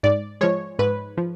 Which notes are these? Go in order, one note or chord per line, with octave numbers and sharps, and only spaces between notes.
G#2 D5
F3 G#3 C#5
G#2 B4
F3